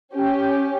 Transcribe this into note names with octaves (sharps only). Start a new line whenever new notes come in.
C#4 G4